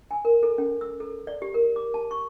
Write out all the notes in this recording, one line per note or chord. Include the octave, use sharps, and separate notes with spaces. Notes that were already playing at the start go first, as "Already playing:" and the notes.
G#5
A#4
A4
C#4
E6
A4
D5
G4
A#4
D6
A5
C#6